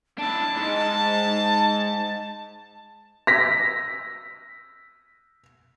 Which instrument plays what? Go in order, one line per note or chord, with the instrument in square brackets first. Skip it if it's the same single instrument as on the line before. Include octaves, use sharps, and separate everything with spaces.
[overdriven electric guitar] D4 E4 [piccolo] A5
[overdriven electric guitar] G#2 G#3
[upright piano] A#6 B6